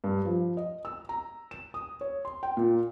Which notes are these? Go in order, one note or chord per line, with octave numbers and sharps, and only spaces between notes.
G2
F3
D#5
E6
A#5
E7
D#6
C#5
C6
G5
A#2